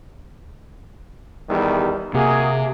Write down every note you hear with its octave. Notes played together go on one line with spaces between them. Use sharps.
E2 D#3 G3
C3 A#3 F#4 G#4